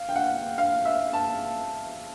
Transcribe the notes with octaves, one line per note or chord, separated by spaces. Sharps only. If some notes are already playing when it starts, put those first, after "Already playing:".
Already playing: F5
G5
F#5
F5
E5
A5